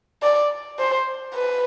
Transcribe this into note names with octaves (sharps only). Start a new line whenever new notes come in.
D5
C5
B4